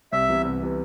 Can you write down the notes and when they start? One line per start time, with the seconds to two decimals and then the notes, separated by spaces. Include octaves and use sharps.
0.12 C2 E5
0.29 C3 E3 B3
0.45 C2
0.62 C3 E3 B3